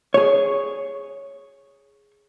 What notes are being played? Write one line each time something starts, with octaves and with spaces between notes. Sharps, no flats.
G#4 C#5